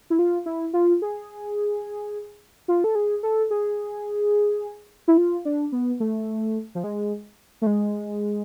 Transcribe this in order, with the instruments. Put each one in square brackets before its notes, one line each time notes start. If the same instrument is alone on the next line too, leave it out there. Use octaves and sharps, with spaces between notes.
[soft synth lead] E4
F4
E4
F4
G#4
F4
A4
G#4
A4
G#4
E4
F4
D4
B3
A3
F3
G#3
A3
G#3